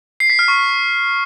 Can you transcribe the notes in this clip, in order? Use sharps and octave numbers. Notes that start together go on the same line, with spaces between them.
C7
B6
F6
C#6